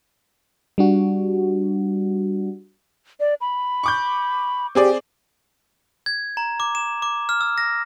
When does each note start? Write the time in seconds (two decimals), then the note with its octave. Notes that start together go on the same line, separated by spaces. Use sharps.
0.78 G3 D4 F#4
3.20 D5
3.41 B5
3.84 C#6 D6 G6
4.75 C4 G4 G#4 D5
6.06 G#6
6.37 A#5
6.60 D6
6.75 E7
7.02 D6
7.29 F6
7.41 E6
7.58 A#6